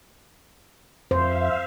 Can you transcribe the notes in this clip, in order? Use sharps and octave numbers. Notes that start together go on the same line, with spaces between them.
F2 C5 E5 F5